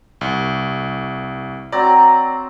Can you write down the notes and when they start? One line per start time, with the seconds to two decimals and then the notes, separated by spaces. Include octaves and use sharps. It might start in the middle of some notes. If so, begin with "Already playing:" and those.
0.21 C2
1.72 F#3 C4 D5 A#5